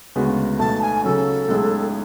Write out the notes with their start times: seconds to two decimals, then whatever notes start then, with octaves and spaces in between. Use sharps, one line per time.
0.15 D2 C#3 G#3 B3 F#4
0.59 B1 B2 A3 A5
0.82 G#5
1.04 C#3 F#3 C#4 A4
1.48 B1 A2 G#3 C#4 G#4